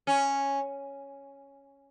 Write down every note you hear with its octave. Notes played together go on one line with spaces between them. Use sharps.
C#4